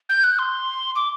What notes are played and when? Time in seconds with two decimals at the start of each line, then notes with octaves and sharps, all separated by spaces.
0.09 G6
0.24 F#6
0.39 C6
0.96 D6